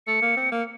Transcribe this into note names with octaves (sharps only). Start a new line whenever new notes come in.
A3 C#7
A#3
C4
A#3